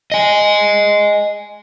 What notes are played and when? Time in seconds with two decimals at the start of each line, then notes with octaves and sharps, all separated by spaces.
0.12 D#5 G#5